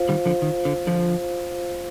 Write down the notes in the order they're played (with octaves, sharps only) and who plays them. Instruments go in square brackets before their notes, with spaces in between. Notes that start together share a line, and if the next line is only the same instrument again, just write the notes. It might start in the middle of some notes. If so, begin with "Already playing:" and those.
Already playing: [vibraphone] F4 C5 F5
[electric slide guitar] D#3 G3
D3 F3
D#3
D3
D3 F3